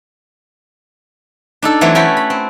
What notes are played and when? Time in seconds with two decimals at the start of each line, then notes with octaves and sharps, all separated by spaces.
1.62 D4 D#4 A4
1.81 E3 F#3 A3 C4 C#5
1.95 C#4 E4 F#4 A4 G5 B5
2.17 B5
2.30 C4